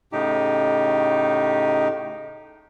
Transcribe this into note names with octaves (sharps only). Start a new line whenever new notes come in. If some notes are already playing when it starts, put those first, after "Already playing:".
A2 C#3 D#4 G4